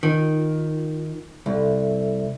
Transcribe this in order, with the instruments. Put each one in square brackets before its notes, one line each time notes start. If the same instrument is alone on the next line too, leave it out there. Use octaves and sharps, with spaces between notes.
[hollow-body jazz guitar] D#3 [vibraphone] D#4 F4
[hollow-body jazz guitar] C2 [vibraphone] A4 E5